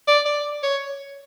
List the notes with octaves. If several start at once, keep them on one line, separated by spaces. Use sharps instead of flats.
D5
D5
C#5